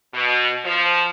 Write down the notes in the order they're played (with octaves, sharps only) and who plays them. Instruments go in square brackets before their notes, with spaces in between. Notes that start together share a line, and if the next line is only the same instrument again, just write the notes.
[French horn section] B2
F3